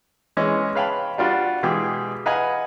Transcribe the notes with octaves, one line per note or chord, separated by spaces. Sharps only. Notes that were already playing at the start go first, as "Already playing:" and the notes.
E3 G#3 C#4 D#5
B4 C#5 F5 G5 A5 B5
G3 D4 F4 F#4
B2 E3 G#3 G4 G#4
B4 D#5 F5 F#5 G#5